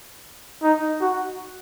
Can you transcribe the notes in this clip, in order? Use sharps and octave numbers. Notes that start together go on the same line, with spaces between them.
D#4
F#4